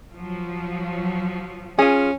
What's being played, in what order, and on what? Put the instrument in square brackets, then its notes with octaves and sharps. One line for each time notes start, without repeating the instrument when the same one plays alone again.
[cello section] F3 F#3
[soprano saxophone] C#4 [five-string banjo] F4 G#4